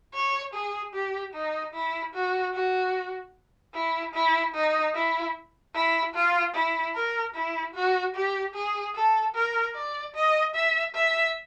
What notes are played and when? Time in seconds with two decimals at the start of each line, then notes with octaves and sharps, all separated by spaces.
0.14 C#5
0.54 G#4
0.94 G4
1.34 D#4
1.74 E4
2.14 F#4
2.54 F#4
3.74 E4
4.14 E4
4.54 D#4
4.94 E4
5.75 E4
6.14 F4
6.55 E4
6.95 A#4
7.35 E4
7.75 F#4
8.15 G4
8.54 G#4
8.95 A4
9.35 A#4
9.75 D5
10.15 D#5
10.55 E5
10.95 E5